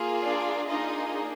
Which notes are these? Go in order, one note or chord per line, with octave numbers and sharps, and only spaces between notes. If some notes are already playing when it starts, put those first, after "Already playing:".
Already playing: A#3 F4 G#4
D4 D5
A#3 D4 D#4 F4 G#4 D#5